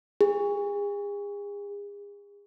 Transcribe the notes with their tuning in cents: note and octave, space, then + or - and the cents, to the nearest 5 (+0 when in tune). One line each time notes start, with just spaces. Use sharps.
G#4 -35